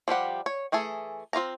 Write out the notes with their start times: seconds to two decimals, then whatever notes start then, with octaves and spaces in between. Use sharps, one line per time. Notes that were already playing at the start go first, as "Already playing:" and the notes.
0.08 F3 G3 G4 F#5
0.46 C#5
0.72 E3 A3 G#4 A4
1.33 C4 F4 F5 A#5